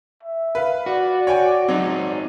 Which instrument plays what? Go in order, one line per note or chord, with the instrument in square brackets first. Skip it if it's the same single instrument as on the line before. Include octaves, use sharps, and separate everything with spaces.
[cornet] E5
[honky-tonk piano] B4 F5
[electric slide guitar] F#4 [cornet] D5
[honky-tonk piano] C#5 G5 G#5
[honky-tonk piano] F#3 [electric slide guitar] C4 D#4